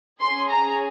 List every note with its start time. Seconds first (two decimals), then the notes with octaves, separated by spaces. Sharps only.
0.20 C#4 G#4 C6
0.50 A#5